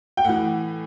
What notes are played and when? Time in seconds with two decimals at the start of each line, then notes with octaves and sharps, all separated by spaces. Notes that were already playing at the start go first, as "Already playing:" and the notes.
0.17 G5
0.25 A2 E3 F#5